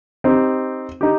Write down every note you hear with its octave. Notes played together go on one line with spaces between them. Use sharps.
C4 D#4 G4
D#4 G4